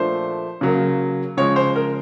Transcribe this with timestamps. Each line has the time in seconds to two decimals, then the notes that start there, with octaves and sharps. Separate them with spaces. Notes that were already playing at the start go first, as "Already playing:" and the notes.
Already playing: A#2 F3 A3 D4 C5
0.61 C#3 F#3 A#3
1.37 C#3 F3 G#3 C#5
1.56 C5
1.76 A#4